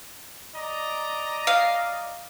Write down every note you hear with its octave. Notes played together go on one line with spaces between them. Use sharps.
D5 D#5 A#5
F5